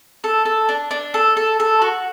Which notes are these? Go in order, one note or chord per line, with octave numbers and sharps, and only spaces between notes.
A4
A4
D4
D4
A4
A4
A4
F#4